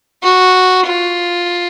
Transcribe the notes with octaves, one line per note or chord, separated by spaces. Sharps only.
F#4
F4